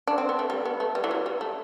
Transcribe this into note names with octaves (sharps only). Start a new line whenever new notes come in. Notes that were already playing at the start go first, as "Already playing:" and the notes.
D4
C4
B3
A3
G3
B3
A3
G3
E3
F#3
G3
A3